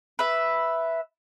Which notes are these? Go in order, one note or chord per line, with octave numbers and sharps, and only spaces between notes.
B4 E5